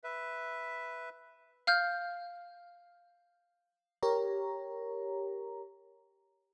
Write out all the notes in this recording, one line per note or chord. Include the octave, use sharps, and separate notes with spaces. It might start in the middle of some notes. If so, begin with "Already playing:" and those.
B4 E5
F5 F6 G6
G4 A#4 C#5 A#5